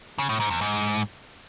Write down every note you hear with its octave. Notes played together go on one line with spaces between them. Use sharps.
C#3
A2
G#2
E2
G#2